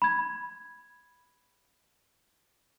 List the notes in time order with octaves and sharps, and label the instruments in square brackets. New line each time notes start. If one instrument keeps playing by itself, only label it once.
[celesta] B5 G#6